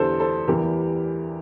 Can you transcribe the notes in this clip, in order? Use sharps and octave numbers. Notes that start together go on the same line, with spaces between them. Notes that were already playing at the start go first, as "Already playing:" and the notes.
Already playing: E2 D3 G3 A4 C5
A4 C5
E2 E3 G3 G4 A#4